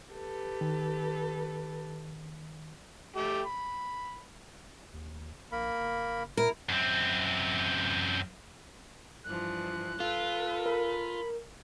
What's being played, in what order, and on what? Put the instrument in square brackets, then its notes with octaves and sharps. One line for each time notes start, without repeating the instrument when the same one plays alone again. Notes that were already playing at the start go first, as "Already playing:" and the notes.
[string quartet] G4 A4 B4
[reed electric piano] D#3
[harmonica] A3 G4
B5
[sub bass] D#2
[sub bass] A#1 [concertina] A#3 A#4 B5
[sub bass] F#1
[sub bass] A#2 [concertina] E4 [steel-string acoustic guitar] A#4
[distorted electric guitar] F#2 C4
[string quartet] G2 E3 F3 [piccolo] F#6
[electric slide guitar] F4 [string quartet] A4 B4
[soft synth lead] A#4 [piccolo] B5